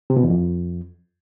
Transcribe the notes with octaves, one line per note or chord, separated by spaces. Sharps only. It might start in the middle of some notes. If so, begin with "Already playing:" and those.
C3
B2
E2
F2